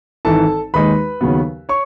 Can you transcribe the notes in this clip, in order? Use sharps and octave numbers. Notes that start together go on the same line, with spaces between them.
G#1 G#2 E3 A4 A5
D#2 D#3 G#3 D#4 B4 B5
D#2 C#3 F#3 B3
C#5 C#6